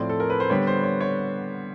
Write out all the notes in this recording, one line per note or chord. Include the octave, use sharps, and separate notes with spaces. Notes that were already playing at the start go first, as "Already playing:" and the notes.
Already playing: A2 F3 A3 C4 D5
A4
A#4
B4
C5
D3 G3 B3 C#5
C5
C#5
C#5